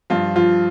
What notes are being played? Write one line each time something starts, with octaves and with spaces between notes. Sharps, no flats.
G2 F3 F4
F3 F4